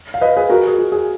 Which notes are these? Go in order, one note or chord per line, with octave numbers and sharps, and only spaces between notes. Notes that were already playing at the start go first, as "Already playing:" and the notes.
F5
B4 D#5
G#4 B4
F#4 A#4
G#4
F#4
G#4